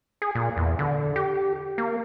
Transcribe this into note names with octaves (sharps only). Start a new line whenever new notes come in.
G#4
A#2
E2
D3
G4
A#3